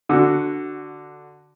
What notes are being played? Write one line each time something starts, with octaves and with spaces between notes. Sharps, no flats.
D3 F#4